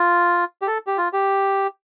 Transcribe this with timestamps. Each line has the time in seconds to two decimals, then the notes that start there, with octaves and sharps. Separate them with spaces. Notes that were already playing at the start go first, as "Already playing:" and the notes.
Already playing: F4
0.62 G4
0.67 A4
0.87 G4
0.98 F4
1.13 G4